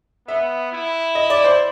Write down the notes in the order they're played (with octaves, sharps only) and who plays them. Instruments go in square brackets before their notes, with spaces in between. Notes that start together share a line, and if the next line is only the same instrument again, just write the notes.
[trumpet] B3 [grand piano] E5
[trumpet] E4
[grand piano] D#5
D5
C5